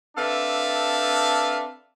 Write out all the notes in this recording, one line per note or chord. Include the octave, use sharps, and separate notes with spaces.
C4 D4 A4 B4 E5 F5